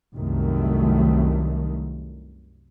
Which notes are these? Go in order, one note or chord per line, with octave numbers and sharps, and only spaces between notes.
C2 F#2 D#3 A3